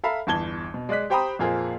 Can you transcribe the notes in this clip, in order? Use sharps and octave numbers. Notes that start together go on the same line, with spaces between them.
A4 E5 F5 A#5 B5
G1 E2 A5 G#6 G7
B2
G#3 D5 D#5 F#6 B6
G4 C5 G5 A#5 B5 D#6
F2 A#2 A#3 F4 G#4 C5